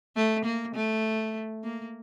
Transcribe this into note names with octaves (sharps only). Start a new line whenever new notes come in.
A3
A#3
A3
A#3